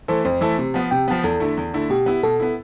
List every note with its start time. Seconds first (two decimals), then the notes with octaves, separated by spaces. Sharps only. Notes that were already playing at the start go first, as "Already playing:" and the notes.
0.08 E3 A3 E4 A4 C5
0.25 F2 C5
0.41 E3 A3 E4 A4
0.58 C3
0.74 F3 B3
0.91 C3 G5
1.08 F3 B3
1.23 E2 A4
1.40 D3 A3 E4
1.57 E2
1.74 D3 A3 E4
1.90 B2 G4
2.06 B3 E4
2.23 B2 A4
2.40 B3 E4